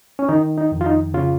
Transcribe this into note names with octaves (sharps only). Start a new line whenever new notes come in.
C#4
D#3 D#4
D#4
F2
F4
D#4
C#3 F4